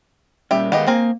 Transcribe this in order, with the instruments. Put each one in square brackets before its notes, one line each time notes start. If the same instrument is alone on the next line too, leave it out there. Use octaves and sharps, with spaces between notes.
[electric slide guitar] A#2 G3 C#4 [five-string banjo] G4 E5
[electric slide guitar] D#3 G#3 F5 [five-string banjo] B3 G4 D#5
[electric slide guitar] A#3 [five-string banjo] C4 G#4 A#4